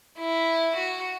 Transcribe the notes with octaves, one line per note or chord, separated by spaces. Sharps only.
E4
F#4